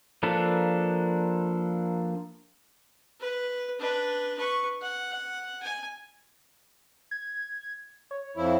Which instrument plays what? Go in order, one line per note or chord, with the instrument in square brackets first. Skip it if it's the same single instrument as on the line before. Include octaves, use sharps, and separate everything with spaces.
[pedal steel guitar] F3 A#3 D4 A4 B4
[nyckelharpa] B4
D4 B4
B4 C#6
F#5
G#5
[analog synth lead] G#6
C#5
[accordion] F2 F3 E4